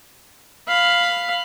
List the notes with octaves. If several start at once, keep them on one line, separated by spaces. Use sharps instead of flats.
F5 B5